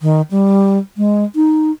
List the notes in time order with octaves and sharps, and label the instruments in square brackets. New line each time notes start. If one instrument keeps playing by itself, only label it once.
[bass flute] D#3
G3
G#3
D#4